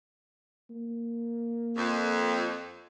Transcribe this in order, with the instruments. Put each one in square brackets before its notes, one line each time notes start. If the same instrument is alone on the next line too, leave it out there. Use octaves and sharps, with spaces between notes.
[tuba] A#3
[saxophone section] F2